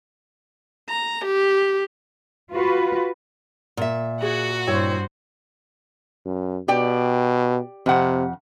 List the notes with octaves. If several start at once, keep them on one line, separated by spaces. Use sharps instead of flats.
A#5
G4
F4 F#4 B4
A#2 E5
F#4 G#4 F#5
G2 E4 C5 C#5 G5
F#2
B2 G4 D5 G5
F2 C3 F#5